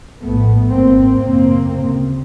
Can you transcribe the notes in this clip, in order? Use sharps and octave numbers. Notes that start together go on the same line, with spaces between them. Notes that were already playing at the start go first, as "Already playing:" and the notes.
A#1 A2 A3 B3
G#1 G#2 A#3 C4
F#1 F#2 C#3 A#3 C4
D2 C#3